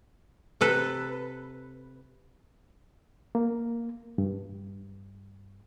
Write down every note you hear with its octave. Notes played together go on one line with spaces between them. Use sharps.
C3 A4 B4
A#3
G2